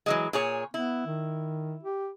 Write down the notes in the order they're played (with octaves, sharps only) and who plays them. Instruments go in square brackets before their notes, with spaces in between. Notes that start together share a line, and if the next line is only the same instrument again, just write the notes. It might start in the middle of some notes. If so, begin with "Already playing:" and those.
[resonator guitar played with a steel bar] E3 F#3 G#3
A#2 G#4 C#5
[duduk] B3 [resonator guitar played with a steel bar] E4
[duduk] D#3
G4